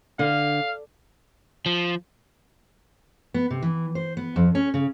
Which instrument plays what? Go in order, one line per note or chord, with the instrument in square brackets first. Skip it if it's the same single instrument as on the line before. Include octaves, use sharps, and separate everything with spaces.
[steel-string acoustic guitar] D3 [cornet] F5
[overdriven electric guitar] F3
[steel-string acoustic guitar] B3
C3
E3
C5
B3
F2
C#4
C#3